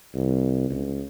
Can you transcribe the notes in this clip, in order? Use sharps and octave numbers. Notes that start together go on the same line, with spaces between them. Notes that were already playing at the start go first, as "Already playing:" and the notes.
C2
C#2